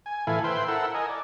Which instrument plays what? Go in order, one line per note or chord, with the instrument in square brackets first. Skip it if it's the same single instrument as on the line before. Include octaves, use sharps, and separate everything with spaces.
[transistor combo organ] G#5
A2 E3 E4 A4 F5 G#5
B4 C5 E5 G5 C6
E4 A4 A#4 F#5 E6
A#4 D#5 G#5
D5